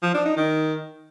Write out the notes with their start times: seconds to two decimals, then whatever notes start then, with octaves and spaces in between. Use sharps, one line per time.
0.03 F3
0.14 D4
0.26 D#4
0.37 D#3